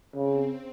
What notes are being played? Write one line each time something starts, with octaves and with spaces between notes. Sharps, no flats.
C#3 C4